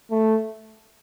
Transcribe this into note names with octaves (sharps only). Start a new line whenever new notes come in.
A3